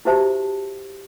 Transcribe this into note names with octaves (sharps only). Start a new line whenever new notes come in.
E4 F#4 G4 C5 E5 A5